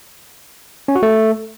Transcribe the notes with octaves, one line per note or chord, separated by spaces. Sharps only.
C#4
F#4
A3